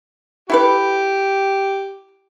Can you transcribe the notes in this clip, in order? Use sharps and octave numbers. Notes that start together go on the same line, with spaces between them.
E4 G4 A4 B4